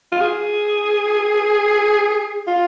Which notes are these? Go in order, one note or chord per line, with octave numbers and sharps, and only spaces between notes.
F4
G#4
F4